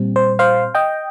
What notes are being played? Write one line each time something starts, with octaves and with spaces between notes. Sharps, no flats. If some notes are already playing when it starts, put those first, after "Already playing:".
Already playing: A#2 G3 C4
C5
C5 F5
D#5 G5